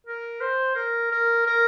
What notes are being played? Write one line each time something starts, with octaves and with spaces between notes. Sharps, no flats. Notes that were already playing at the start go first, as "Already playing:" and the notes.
A#4
C5
A#4
A#4
A#4